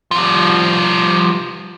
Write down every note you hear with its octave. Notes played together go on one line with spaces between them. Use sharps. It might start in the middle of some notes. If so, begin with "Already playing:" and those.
F3 G3